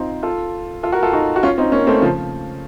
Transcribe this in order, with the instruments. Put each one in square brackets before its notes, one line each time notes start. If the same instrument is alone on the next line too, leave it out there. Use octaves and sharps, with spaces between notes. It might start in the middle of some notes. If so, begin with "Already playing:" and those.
Already playing: [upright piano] C4 D#4 F4
F4 A4
F4 A4
F#4 A#4
F4 A4
D#4 F#4
F#4
C#4 F4
C4 D#4
A#3 C#4
A3 C4
C#3 F3